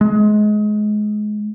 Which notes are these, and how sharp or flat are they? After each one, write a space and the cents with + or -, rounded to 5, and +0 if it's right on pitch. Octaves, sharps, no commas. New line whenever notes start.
G#3 +25